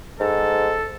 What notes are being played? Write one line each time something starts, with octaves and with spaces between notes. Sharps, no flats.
G#2 A4